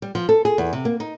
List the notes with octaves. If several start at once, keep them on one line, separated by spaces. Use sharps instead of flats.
G3
F3
A4
G#4
E2
C3
A#3
D#4